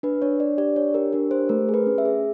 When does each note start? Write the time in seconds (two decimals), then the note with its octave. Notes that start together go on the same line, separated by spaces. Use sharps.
0.03 D4 B4
0.22 D4 C#5
0.40 D4 D5
0.58 G4 D5
0.76 D4 C#5
0.94 G4 A#4
1.13 D4 A#4
1.31 G4 C5
1.49 A3 A#4
1.69 G#4
1.74 B4
1.87 C#4
1.98 E5
2.05 G#4